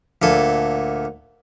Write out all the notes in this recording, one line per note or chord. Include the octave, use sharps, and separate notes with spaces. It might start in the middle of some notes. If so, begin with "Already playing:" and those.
D2 A#2 A4 G#5